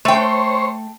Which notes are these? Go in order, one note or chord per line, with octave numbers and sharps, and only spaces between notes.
A3 C5 C#5 G5